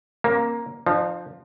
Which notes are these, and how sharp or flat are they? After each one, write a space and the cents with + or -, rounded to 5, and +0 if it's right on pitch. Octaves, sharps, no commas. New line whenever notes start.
A#3 +10 C#4 -40
F3 +0 D#4 -45